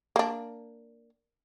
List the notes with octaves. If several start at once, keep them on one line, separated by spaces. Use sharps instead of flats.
A#3 D4